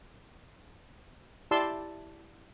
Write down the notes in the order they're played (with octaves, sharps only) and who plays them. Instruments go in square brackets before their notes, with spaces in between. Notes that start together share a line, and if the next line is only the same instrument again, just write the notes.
[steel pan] E4 G4 D5 A5 C6 E6